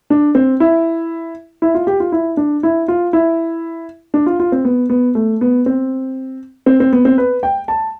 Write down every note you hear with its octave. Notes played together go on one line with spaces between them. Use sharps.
D4
C4
E4
E4
F4
G4
F4
E4
D4
E4
F4
E4
D4
F4
F4
C4
B3
B3
A3
B3
C4
C4
C4
B3
C4
B4
G5
A5